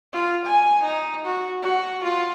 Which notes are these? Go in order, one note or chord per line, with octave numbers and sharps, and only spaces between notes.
F4
G#5
D#4
F#4
F#4
F4